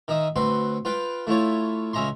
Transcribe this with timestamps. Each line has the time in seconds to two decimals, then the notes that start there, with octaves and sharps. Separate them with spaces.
0.08 D#3 D#4 E5 D#6
0.36 D2 C4 F#4 B4 C6
0.85 F4 B4 F5 G5
1.27 A3 E4 F4 C#5
1.93 C#2 C#4 E5 A#5 C6